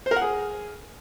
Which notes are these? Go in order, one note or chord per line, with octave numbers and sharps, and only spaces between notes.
C5
A#4
F#5
G#4